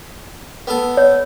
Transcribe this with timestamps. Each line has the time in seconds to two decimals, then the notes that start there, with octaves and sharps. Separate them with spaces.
0.67 B3 A4
0.97 C#5